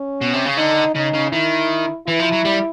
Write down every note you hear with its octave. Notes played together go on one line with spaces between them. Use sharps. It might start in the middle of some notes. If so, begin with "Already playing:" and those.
Already playing: C#4
B2
C3
C#3
D3 D#4
C#3 D#4
C#3
D#3 E4
E3 E4
F3
F#3
G3